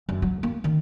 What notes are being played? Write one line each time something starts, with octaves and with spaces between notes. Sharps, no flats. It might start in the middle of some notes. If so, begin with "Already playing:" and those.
F#2
F#3
A#3
D#3